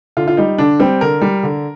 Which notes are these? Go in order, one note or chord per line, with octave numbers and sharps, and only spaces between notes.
D3 F4
F4
G3 D#4
D3 D4
G3 C4
D3 A#4
G3
D3